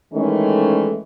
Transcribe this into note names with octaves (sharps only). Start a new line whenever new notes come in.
D#3 E3 G#3 A3 C#4